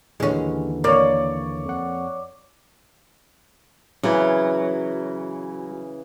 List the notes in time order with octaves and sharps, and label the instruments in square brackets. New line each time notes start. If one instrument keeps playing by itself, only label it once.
[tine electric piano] D#2 D3 E3 [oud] G#3 C#4
[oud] A#3 [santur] C#5 D5
[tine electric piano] F2 F#5
[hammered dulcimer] C#3 E3 [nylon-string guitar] F#3